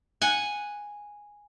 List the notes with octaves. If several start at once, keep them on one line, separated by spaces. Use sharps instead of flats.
F#5 G#5